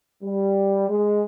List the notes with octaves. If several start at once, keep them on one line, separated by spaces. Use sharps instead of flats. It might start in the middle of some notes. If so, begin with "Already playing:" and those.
G3
G#3